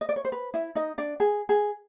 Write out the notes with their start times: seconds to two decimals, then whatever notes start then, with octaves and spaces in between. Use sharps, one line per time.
0.01 D#5
0.09 D5
0.16 C#5
0.25 C5
0.32 B4
0.54 E4 E5
0.75 D#4 D#5
0.98 D4 D5
1.20 G#4
1.49 G#4